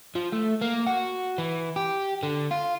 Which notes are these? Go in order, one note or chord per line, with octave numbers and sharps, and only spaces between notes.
F3
A3
A#3
F#4
E3
G4
D3
F4